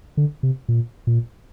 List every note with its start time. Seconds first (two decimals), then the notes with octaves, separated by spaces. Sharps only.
0.17 D3
0.43 C3
0.69 A#2
1.07 A#2